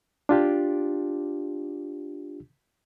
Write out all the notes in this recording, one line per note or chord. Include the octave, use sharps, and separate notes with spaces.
D4 F4 G4